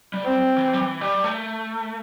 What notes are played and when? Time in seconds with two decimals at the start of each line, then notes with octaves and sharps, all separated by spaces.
0.14 G3
0.25 C4
0.58 E3
0.73 G3
0.80 E3
1.01 G3
1.24 A3